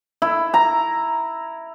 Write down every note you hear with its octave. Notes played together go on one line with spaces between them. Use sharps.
E4
A#5